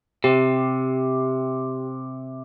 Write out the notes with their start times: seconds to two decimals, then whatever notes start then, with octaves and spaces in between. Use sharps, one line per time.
0.24 C3 G4